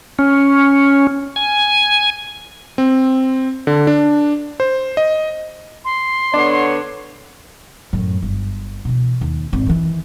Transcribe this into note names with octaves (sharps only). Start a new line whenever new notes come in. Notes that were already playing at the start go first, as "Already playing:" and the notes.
C#4
G#5
C4
D3
D4
C5
D#5
C6
D3 B3 D4 C#5
F#2 A2
G1
B2 E3
D#2
D1 G#1
D#3 E3